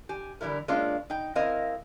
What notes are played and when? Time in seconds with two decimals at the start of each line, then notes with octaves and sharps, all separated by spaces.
0.09 G4 G#5
0.41 D3 E3 G3 E4 A#4
0.68 G#3 A#3 C#4 D4 F4
1.10 D#4 G5
1.35 C#3 C4 E4 A#4 D#5 F5